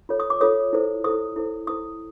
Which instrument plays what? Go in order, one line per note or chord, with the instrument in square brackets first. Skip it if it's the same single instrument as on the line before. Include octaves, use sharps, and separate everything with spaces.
[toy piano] F4 A4 C#5
D#6
D6
F4 A4 C#5 D#6
E4 A4 C5
E4 A4 C5 D#6
E4 A4 C5
E4 A4 C5 D#6